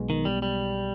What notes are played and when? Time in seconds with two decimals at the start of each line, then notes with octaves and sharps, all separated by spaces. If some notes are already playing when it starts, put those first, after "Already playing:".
Already playing: B1 B2 G#3
0.10 D#3
0.25 G3
0.42 G3